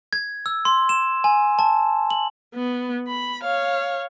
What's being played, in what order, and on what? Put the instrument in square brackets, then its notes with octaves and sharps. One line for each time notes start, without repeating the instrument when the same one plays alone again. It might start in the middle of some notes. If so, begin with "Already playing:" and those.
[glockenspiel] G#6
E6
C6
E7
G#5
A5
F#7
[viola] B3
B5
C#5 F5